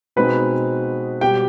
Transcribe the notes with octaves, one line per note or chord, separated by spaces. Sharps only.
B2 G#3 C4 D#4 B4 B5
B2 G3 B3 G4 G5